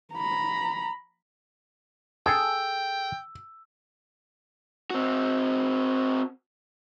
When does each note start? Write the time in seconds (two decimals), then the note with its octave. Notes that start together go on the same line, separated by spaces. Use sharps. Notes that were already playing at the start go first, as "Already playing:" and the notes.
0.14 A#5 B5
2.26 G#4 A4 G5 E6
4.90 C4 F#4